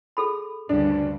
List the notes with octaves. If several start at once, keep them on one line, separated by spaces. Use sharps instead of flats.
G#4 A4 B5
D2 G2 C#3 D4